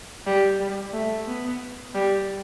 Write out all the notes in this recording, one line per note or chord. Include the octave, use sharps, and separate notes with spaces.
G3
G3
A3
B3
G3